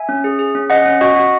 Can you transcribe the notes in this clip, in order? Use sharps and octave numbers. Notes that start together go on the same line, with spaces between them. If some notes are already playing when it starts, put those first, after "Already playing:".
Already playing: E5 G#5
C#4
G#4
G#4
C#4
C#4 D#5 F#5
C#4
F#4 D#5 F#5
F#4